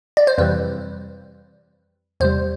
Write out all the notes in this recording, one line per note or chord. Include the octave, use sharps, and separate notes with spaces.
D5
C5
F2 C3 E3 G3 B4
E2 C3 G3 C5